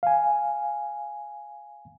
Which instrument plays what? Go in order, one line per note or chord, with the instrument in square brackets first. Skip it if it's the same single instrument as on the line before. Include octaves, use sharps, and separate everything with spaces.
[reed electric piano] F5 G#5